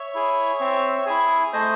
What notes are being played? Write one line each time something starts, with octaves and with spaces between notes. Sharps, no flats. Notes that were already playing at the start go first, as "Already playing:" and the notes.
Already playing: C#5 E5
E4 G#4
C4
E4 G#4
A3 C5 D#5